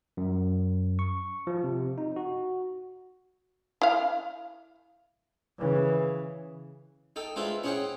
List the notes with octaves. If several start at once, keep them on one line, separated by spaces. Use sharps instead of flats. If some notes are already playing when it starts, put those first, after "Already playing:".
F#2
C#6
F3
C3
D#4
F#4
E4 F5
C#3 E3
D#4 A4 G5
G#3 D4 F4 B4 C5 E5
C#4 E4 G#4 C5 F#5 G5